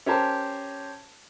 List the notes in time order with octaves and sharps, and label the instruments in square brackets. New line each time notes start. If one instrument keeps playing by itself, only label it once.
[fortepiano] C#4 G4 A#4 C5 A5